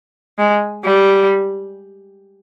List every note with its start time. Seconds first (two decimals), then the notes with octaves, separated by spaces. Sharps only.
0.39 G#3
0.84 G3